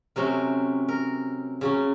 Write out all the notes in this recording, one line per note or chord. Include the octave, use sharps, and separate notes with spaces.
C3 F#3 A3 C#4 A#4
A#4
C#3 F#3 A#3 C#4